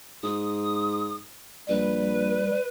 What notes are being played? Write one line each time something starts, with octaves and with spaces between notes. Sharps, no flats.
G#2 D#6
A#1 G3 B4